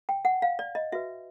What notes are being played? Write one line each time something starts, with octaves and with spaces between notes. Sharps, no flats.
G5
F#5
F5
D5
D#5
F#4 B4 E5